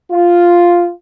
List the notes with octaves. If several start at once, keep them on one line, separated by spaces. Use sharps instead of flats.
F4